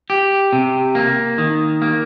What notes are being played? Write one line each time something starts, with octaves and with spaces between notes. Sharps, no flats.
G4
C3
A#3
D#3
A#3